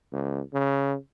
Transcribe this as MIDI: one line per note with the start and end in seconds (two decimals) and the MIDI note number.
0.13 0.41 37
0.53 0.95 49